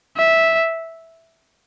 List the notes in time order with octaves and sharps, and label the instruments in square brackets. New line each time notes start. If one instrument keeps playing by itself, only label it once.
[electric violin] E5